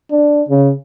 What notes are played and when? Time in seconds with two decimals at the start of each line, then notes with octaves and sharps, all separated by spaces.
0.11 D4
0.49 C#3